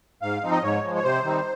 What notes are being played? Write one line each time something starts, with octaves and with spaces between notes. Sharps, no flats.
G#2 F5
F3 C4 D#4
D#5
G#2 C#5
F3 G#3
C#5
C3 C5
D#3 G3 C4 D#4